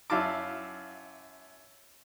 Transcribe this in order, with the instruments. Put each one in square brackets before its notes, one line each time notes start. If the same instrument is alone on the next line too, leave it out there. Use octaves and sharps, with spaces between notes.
[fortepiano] F#2 E4 F5 A5 D6